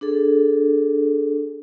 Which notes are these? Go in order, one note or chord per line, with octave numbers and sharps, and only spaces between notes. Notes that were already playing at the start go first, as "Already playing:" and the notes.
D4 G#4 A4